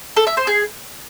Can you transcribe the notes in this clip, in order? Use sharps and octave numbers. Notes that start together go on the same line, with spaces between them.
A4
E5
C5
G#4